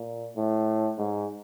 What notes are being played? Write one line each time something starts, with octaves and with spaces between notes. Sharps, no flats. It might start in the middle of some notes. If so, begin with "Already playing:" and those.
Already playing: A#2
A2
G#2